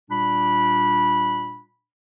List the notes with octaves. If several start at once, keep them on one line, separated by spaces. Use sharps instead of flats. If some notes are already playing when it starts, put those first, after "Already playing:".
A#2 G3 D4 B5